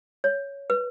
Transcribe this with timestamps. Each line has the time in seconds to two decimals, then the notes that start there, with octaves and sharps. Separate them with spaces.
0.24 C#5
0.70 B4